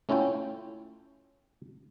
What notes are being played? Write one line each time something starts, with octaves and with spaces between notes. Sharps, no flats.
A3 C#4 E4 F4 G5